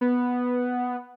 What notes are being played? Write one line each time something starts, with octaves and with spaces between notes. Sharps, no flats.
B3